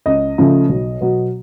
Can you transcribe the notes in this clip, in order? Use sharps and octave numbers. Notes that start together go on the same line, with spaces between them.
C#2 D#5
C#3 F3 A3
B1
B2 F#3 B3